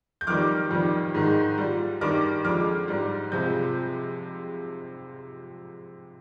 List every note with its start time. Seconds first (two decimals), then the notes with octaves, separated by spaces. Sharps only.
0.21 G6
0.27 F2 D#3 G3 D6 F6
0.71 F2 D#3 G3
1.14 G#2 D#3 G#3
1.58 A#2 G3
2.01 G2 D#3 G3 D6 F6
2.45 F2 D3 G#3 D6 F6
2.88 G#2 G3
3.32 F2 C3 F3 G#3 G6